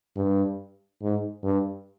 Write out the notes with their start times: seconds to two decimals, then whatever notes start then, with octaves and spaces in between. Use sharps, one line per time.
0.17 G2
1.02 G#2
1.44 G2